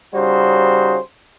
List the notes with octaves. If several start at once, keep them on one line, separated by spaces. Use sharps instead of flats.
C#3 G3 D#4 F#4 C5